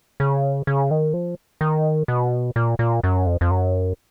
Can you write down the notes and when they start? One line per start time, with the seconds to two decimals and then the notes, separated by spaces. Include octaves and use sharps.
0.20 C#3
0.67 C#3
0.91 D#3
1.14 F3
1.61 D#3
2.08 B2
2.56 A#2
2.79 A#2
3.04 F#2
3.26 F2
3.41 F2
3.51 F#2